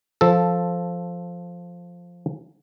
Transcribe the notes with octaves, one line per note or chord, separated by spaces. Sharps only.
F3 A4